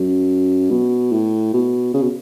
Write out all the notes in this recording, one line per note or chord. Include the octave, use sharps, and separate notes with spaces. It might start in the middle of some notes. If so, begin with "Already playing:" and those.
Already playing: F#2
B2
A2
B2
C#3
B2